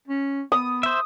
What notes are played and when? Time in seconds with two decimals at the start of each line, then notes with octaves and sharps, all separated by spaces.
0.07 C#4
0.52 B3 D#6
0.83 C5 E5